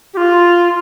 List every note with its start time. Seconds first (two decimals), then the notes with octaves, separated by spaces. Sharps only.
0.14 G4
0.17 F4